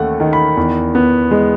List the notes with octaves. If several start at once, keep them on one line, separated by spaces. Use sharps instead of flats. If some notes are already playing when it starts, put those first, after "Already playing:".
Already playing: D#2 A3 C#4 F#5
D#3
B5
E2
B3
G#3